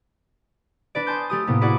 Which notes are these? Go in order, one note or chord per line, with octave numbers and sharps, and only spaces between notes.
D4 B4 D5
G#5 A5 C6 D#6 G6
A3 G4 D#6
A2 C3 A#3 B3 G4
E4 F#4 G#4 D5 F#5 D6